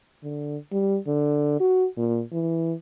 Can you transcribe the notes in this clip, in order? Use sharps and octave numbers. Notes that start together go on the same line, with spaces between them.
D3
G3
D3
F#4
A#2
E3